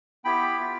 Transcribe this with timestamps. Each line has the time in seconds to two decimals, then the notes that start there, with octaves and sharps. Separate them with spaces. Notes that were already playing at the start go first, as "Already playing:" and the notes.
0.25 B3 E4 G4 G5 B5
0.59 B3 F4